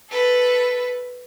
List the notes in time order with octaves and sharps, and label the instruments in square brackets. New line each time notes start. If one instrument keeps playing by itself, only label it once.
[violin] A4 B4